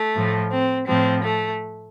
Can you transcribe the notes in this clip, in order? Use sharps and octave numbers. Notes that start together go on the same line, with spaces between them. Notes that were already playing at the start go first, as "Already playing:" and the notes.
Already playing: A3
A2 F3
C4
A2 F3 C4
A3